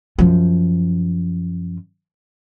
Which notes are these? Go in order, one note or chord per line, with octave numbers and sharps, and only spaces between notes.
F#2 F3